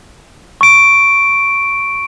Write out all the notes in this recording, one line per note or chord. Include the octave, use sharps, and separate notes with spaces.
C#6 D7